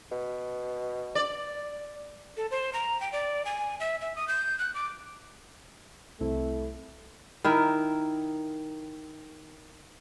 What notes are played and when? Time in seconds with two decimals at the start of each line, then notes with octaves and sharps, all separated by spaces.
0.11 B2
1.15 D5
2.37 A4
2.51 C5
2.73 A#5
3.01 G5
3.12 D5
3.45 G#5
3.80 E5
4.01 E5
4.16 D#6
4.28 G6
4.59 F#6
4.74 D6
6.20 C2 A3 C4 E4
7.44 D#3 E4 A#4